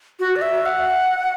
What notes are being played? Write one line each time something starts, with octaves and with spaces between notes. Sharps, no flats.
F#4
D5
E5
F#5